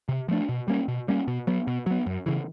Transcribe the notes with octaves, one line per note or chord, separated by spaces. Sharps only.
C3
F3 A3 D4
B2
G3 A#3 C#4
B2
G3 A#3 C#4
B2
F#3 B3
B2
F#3 B3
F#2
C#3 E3